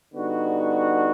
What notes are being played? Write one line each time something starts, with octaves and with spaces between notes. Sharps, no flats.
D3 G3 B3 D#4 F#4